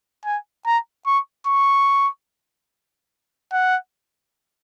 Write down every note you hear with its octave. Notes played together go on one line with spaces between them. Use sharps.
G#5
A#5
C#6
C#6
F#5